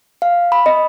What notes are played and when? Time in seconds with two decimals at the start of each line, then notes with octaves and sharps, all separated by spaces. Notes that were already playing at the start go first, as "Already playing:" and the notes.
0.22 F5
0.52 B5
0.66 D#5